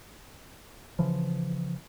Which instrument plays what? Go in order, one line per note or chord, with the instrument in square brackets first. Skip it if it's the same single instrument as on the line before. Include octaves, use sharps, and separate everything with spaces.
[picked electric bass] C#3 E3 F3